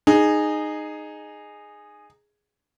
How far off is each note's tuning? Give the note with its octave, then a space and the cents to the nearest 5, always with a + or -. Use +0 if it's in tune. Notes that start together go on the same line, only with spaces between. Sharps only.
D#4 -15 G#4 +0